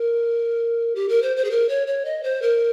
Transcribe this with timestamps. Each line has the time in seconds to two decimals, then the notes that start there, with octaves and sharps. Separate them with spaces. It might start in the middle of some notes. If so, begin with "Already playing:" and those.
Already playing: A#4
0.95 G4
1.09 A#4
1.22 C5
1.37 C5
1.45 G#4
1.51 A#4
1.69 C#5
1.87 C#5
2.05 D#5
2.24 C5
2.42 A#4